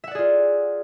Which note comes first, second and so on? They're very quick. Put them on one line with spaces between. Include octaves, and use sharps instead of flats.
E5 F#5 D5 G#4 F4